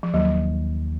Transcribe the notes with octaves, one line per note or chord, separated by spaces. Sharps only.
F3
D#2 F#3